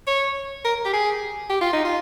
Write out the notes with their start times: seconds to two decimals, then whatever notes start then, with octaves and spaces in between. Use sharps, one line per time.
0.07 C#5
0.64 A#4
0.85 G4
0.93 G#4
1.50 G4
1.61 F4
1.73 D#4
1.85 F4